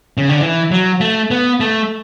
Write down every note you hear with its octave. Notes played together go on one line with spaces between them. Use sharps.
C#3
D3
E3
F#3
A3
B3
A3